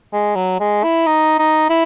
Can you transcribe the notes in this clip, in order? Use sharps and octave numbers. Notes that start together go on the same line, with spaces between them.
G#3
F#3
G#3
E4
D#4
D#4
E4